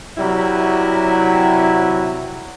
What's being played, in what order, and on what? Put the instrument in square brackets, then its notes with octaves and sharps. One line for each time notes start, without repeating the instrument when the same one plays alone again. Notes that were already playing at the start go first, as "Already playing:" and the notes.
[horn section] C3 F#3 G3 E4 B4